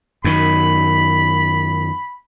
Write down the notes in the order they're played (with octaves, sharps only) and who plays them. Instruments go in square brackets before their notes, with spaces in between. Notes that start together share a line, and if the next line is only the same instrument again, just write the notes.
[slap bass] F#2 D#3 [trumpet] B5